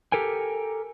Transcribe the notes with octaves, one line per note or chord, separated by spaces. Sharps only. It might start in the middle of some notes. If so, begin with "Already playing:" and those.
G4 A4 A#4 G5 G#5